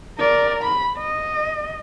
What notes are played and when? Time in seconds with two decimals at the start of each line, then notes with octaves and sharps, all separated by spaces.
0.19 A#4 D5
0.63 B5
0.98 D#5